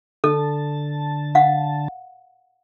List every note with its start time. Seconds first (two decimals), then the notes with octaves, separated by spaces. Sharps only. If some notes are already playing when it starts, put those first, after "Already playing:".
0.24 D3 A4 A5
1.35 F5 F#5